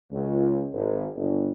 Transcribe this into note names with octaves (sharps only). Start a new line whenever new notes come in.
C#2
G#1
G1